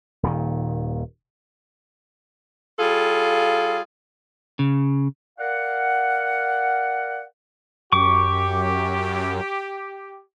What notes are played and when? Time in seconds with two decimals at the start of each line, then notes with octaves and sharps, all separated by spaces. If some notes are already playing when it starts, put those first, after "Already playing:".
0.23 D#1 A#2 D#3
2.79 G3 F4 G#4 A4 F5
4.59 C#3
5.39 A#4 D5 F5 F#5
7.92 F#2 G4 C#6 D6